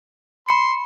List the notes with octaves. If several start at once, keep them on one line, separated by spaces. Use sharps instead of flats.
B5 C6 C#7